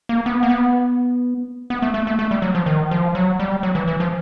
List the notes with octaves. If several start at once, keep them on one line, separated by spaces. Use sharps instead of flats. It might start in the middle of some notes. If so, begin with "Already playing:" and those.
A#3
B3
A#3
B3
B3
A3
A3
A3
A3
G3
F#3
F3
D#3
F3
F#3
G3
F#3
E3
E3
F3